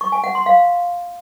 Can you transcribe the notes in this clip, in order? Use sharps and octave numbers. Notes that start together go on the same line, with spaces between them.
C#6
G#5
F#5
C6
F5